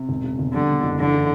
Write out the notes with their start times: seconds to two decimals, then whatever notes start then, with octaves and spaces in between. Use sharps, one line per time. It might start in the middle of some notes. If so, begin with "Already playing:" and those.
Already playing: C3
0.09 E1
0.24 C#3
0.39 E1
0.54 D3 G3
0.69 B2
0.83 F#1
0.99 D3 E3
1.14 C#3